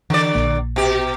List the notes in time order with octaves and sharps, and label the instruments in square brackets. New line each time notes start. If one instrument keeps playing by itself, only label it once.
[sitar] D3 D5 [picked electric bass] E3
[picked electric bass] A#1 A#3
[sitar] B2 G4